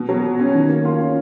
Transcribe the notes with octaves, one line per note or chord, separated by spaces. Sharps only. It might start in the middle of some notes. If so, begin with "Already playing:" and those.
Already playing: B2
F#3
B2
C#4
D#3
A#3
F4
C#4